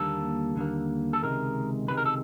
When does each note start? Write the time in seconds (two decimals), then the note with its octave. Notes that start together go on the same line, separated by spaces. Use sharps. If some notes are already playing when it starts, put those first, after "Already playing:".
Already playing: D#2 D3 G3 A#3 A4
0.56 D#2 D3 G3 A#3
1.13 A4
1.22 C#2 C3 D#3 G#3 A#4
1.88 C#2 C3 D#3 G#3 B4
1.97 A#4
2.05 A4